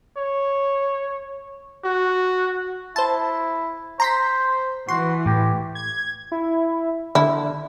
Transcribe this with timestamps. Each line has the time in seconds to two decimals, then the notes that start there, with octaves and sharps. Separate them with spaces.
0.17 C#5
1.85 F#4
2.96 E4 C5 A5
4.00 C5 A#5 C6 B6
4.89 E3 F#4 C6
5.26 A2 G4
5.75 G#6
6.32 E4
7.15 D3 E4